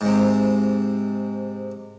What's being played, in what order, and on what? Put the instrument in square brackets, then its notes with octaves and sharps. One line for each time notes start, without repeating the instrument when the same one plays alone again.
[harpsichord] G#2 C3